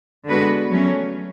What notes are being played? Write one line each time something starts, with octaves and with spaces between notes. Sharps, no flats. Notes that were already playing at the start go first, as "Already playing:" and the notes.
D3 G#3 B3 F#4 B4
F#3 A3 C#4